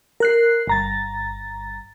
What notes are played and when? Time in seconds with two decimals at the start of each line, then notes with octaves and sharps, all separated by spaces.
0.20 A#4 F#6 C7
0.67 G1 A#5 A6